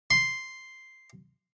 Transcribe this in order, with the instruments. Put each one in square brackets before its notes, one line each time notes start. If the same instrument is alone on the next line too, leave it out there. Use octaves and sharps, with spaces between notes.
[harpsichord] C6